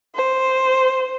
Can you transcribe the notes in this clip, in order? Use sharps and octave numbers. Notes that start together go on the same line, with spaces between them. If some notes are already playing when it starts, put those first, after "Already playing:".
C5